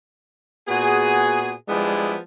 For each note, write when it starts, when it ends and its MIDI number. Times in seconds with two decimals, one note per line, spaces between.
0.69 1.53 46
0.69 1.53 59
0.69 1.53 66
0.69 1.53 68
1.69 2.17 53
1.69 2.17 55
1.69 2.17 56
1.69 2.17 59
1.69 2.17 62
1.69 2.17 64